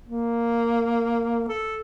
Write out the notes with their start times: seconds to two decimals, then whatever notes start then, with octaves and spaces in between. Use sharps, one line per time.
0.08 A#3
1.48 A4